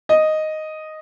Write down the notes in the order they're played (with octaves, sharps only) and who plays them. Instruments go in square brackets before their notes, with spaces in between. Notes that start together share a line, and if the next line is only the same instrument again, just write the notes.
[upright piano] D#5